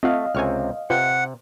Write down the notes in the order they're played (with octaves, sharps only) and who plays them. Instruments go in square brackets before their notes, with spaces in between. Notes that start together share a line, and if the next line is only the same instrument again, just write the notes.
[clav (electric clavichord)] A3 [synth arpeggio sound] C4 F4 F#5 [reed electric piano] D#5 F5
[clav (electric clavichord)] C#2 C3 C4 [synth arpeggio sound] G#5 C#6 F6
[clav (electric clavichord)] C3 [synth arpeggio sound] F4 B4 G5 [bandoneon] F#5